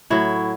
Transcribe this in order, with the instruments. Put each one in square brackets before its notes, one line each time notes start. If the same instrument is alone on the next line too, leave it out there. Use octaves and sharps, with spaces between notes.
[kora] A2 F#3 E4